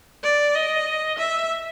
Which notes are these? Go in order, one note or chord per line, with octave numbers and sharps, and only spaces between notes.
D5
D#5
E5